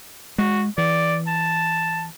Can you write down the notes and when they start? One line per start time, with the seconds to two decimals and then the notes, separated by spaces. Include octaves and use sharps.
0.38 G#3 F#4
0.78 E3 D5
1.28 A5